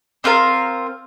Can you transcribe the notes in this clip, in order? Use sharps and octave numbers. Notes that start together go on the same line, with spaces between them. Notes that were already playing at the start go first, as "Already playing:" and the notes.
C4 F4 A#4 F5